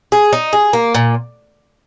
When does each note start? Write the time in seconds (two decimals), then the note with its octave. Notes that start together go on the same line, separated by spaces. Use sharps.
0.12 G#4
0.33 D#4
0.53 G#4
0.73 A#3
0.95 A#2